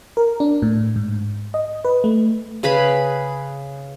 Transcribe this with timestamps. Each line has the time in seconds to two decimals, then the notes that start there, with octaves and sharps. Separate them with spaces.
0.17 A#4
0.40 D4
0.62 A2
0.96 G#2
1.54 D#5
1.85 B4
2.04 A3
2.63 C#3 G#4 B4 B5